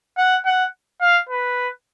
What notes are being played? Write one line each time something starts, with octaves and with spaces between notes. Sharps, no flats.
F#5
F#5
F5
B4